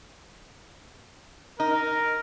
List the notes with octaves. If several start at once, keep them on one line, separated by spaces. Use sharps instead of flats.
D#4 A#4